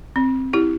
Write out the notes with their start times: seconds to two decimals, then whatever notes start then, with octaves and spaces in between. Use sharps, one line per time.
0.16 C4
0.53 E4 G4